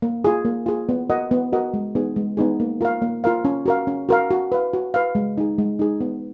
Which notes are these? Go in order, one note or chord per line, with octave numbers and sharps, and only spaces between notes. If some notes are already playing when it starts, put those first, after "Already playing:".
A#3
F4 G#4
A#3
F4 G#4
B3
F#4 A#4 D#5 F#5
B3
F#4 A#4 D#5 F#5
G#3
B3 D#4 G#4
G#3
B3 D#4 G#4
A#3
F4 A#4 F5
A#3
F4 A#4 F5
C#4
F#4 A#4 F5
C#4
F#4 A#4 F5
F#4
B4 F5
F#4
B4 F5
G#3
D#4 G#4
G#3
D#4 G#4
B3